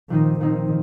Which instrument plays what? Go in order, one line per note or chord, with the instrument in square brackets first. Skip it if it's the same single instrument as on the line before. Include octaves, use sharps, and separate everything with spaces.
[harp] A#2 F3 C4 D#4 [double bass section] D#3
[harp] A#2 F3 C4 D#4 [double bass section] D#3